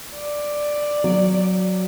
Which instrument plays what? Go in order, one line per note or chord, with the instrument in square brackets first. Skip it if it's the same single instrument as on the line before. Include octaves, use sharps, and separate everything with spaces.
[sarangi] D5
[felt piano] F#3